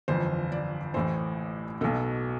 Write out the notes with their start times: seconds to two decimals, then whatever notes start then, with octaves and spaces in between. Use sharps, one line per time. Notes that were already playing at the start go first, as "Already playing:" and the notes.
0.08 G1 F2 E3 C5
0.52 D5
0.94 A1 A2 E3 C5
1.81 B1 B2 A4